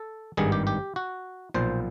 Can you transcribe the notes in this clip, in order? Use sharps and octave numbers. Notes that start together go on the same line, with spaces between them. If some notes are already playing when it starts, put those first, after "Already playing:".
Already playing: A4
G#1 G2 D#3 G3 G#4
G4
G4
F#4
B1 A#2 F3 C5